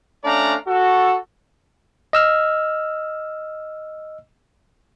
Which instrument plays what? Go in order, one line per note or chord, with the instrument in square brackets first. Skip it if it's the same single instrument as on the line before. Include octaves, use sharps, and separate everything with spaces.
[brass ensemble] A3 C#4 D4 D5 F5 A#5
F#4 A4
[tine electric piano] D#5 E6 F6